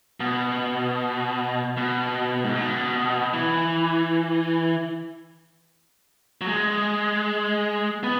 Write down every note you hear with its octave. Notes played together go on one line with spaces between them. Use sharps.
B2
B2
G#2
B2
E3
F#3
G#3
B3